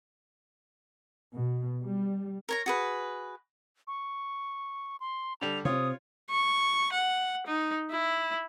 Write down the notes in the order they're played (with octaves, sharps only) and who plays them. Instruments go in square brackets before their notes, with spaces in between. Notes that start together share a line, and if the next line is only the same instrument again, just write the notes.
[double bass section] B2
G3
[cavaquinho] A#4 C#5 A#5
F#4 G#4 B4
[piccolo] C#6
C6
[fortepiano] D3 G3 [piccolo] F7
[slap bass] C3 [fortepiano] F4 C#5 [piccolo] D#6
[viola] C#6
F#5
D#4
E4